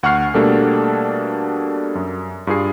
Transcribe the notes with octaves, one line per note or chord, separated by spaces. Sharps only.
D2 F#5 C#6 F6 C7
B2 G3 A3 A#3 D4 A4
F#2
G2 F4 G#4 C7